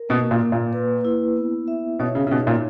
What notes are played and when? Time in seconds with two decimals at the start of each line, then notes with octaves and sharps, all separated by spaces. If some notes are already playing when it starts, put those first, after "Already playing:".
Already playing: A#4
0.09 B2 A#3
0.31 A#2
0.41 A#3
0.52 A#2
0.73 B4
1.05 E4
1.37 B3
1.68 E5
1.99 B2 C#5
2.15 C#3
2.27 C#3
2.31 B2 D#4
2.47 A#2